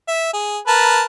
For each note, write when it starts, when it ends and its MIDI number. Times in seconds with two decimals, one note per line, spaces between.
0.08 0.28 76
0.33 0.58 68
0.67 1.03 70
0.67 1.03 71
0.67 1.03 81